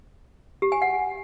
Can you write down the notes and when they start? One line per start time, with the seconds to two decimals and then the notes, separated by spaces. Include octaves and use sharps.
0.62 G4
0.72 G#5
0.82 F#5